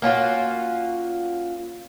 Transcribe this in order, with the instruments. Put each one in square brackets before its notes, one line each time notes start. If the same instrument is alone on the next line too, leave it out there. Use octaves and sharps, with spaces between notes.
[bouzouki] A#3 C#4 F4 F#4